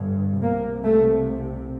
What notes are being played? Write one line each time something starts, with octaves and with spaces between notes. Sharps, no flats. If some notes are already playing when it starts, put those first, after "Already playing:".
Already playing: G1 G2
C2 C3 A#3
A3